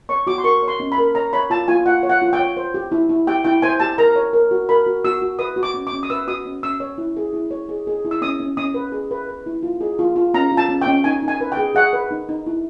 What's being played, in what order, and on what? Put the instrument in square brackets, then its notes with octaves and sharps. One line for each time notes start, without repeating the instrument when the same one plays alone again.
[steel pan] C#5 C#6
F#4 D6
C6
A#4 C#6
C#5
C6
C#4
B5
A#4
C#5 A#5
C#5 B5
F4 A5
F4 G#5
F4 F#5
C#5
F#5
F4
G5
C#5
C5
G4
E4
E4
G4 G5
E4 G5
C5 G#5
G4 A5
A#4 A#5
C#5
A#4
F#4
A#4 B5
F#4
F#4 E6
F#4
B4 D#6
F#4
D6
C#4
D6
C#4
D#6
B4 E6
F#4 D#6
C#4
C#4 E6
C#5
E4
G#4
E4
C#5
G#4
G#4
E4
E6
C#4 D#6
C#4
C#4 D#6
B4
G#4
B4
B4
E4
F4
G#4
F4
F4
C#4 A#5
F4
A5
C#4
C#4 G5
D#4 G#5
D#4
G#5
B4
G5
G#4
G#4 F#5
B4
D#4
D#4
E4